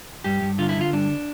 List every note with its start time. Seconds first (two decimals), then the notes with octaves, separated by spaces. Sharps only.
0.24 G2 G4
0.42 G2
0.58 D3 F4
0.69 E4
0.76 D3 F4
0.93 G2 D4